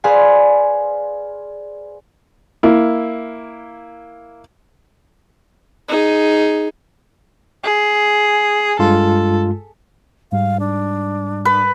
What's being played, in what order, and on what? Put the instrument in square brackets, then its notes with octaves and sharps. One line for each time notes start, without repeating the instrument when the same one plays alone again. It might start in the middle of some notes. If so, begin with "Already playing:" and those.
[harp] G#4 B4 C5 D5 F5 G#5
[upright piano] A#3 E4
[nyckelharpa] D#4 G#4
[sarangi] G#4
[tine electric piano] G2 G#3 F4 [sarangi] A4
[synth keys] G#2 G3 [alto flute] F5
[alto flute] D4
[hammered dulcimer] B4